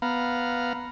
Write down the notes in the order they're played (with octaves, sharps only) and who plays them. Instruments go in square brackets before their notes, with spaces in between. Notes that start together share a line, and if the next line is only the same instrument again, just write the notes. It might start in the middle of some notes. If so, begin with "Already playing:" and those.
[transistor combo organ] B3 F5 A#5